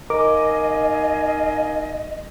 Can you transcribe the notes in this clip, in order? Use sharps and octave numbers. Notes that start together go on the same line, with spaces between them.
D#4 A#4 D#5 F5 G#5 D6